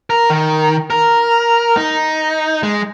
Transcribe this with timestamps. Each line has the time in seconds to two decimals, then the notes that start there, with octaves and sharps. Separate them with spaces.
0.10 A#4
0.30 D#3
0.90 A#4
1.77 D#4
2.63 G#3